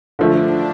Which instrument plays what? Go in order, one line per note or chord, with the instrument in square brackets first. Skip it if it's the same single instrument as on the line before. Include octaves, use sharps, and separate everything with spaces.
[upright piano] D3 F3 A3 [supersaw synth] D4